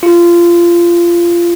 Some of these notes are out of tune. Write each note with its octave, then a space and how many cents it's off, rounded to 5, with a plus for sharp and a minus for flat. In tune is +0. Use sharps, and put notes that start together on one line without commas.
F4 -25